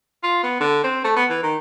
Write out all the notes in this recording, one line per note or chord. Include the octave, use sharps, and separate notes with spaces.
F4
B3
D3
C4
A3
B3
E3
D#3